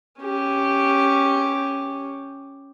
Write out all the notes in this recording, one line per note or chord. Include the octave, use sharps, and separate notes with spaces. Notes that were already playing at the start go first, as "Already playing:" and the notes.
C#4 G4